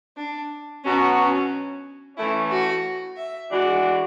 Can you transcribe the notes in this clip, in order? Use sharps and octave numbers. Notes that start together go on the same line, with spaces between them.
D4
B2 F#3 B3 C#4 F#4
C#4
E3 A3 C#4 E4
F#4
E5
E3 G#3 D4 F#4